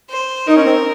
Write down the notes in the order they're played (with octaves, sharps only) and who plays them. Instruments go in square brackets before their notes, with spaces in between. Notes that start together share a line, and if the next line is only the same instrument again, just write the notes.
[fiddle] C5
[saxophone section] D#4 [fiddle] A#4
[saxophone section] C#4
C4